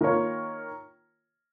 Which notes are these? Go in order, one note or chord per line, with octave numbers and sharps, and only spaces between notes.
D#3 A#3 F4 A#4 C#5